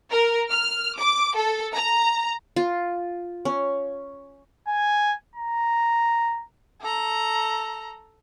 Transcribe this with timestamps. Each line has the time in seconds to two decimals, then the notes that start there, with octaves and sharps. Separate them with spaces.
0.10 A#4
0.50 F6
0.98 D6
1.36 A4
1.74 A#5
2.56 F4
3.45 C#4
4.67 G#5
5.35 A#5
6.82 A4 A#5